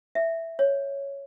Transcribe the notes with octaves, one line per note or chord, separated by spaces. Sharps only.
E5
C#5